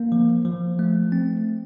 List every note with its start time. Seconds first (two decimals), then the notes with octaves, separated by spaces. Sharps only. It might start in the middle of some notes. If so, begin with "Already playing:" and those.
Already playing: A#3
0.12 F3
0.45 F3
0.79 A3
1.12 C4